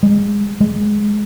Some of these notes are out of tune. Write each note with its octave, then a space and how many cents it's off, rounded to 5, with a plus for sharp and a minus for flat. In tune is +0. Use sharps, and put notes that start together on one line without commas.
G#3 -25
G#3 +5